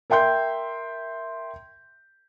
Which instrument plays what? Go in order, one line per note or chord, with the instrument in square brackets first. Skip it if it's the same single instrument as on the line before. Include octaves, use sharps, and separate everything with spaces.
[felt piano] A#4 E5 G5 C6 G6